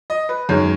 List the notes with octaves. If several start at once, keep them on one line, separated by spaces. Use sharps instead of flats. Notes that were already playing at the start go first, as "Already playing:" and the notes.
D#5
B4
F#2 D#3 G#3 C#5